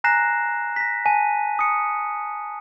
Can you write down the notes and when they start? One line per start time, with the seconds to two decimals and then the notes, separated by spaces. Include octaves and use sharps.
0.04 G#5 A#5 F#6 A#6 C7 E7
0.76 A#6 B6
1.06 G#5 A5 D#7
1.59 D#6 C#7